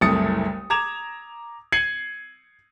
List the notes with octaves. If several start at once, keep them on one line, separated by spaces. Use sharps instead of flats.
F#1 C2 A3 D#6 A6 C#7
A#5 D6 G#6 E7 F7
G#6 C7 C#7 D#7 F#7